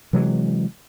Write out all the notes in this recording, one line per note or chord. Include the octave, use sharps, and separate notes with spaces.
C3 E3 F#3 G#3